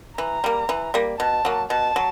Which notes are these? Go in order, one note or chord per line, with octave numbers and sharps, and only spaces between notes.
E3 A#5
G3 A#3
E3
G3 A#3
B2 A5
F#3 A#3
B2 A5
F#3